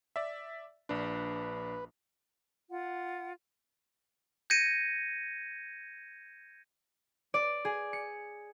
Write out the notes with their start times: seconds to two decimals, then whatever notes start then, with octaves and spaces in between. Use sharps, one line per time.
0.16 D5 E5
0.89 A#1 D4 B4
2.70 F4 F#5
4.50 G6 G#6 A#6 C#7 D#7
7.34 D5
7.65 G#4
7.93 C#7